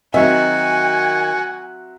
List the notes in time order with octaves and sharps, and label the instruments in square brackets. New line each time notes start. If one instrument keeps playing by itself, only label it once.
[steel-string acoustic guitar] D#3 [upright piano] F#3 C4 E5 [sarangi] F#4 [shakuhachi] G#5